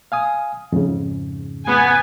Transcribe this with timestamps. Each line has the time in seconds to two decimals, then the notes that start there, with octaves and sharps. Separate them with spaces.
0.12 F5 G#5 D#6
0.72 F2 G#2 C#3
1.65 B3 G#5